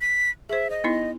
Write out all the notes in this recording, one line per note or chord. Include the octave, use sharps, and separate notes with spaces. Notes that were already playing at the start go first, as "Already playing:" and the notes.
B6
G#4 C5 E5
D#5
B3 D#4 E4